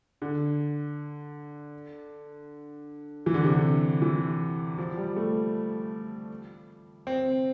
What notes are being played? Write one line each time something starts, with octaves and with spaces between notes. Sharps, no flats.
D3
E3
D3
C3
D3
E3
F3
G3
A3
C4